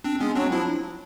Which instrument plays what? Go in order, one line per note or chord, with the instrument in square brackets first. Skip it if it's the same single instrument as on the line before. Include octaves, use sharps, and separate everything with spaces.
[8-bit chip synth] C4 D4
[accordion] G#3 [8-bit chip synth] B3 C#4
[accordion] F#3 [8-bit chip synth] C4 D4
[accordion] F3 [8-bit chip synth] D4 E4